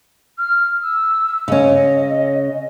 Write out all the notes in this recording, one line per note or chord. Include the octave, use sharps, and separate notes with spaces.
F6
E6
C#3 C#4 D#5